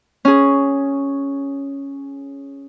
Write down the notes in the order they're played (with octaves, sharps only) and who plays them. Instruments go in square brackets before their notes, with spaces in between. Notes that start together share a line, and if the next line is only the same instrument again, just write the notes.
[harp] C#4 G#4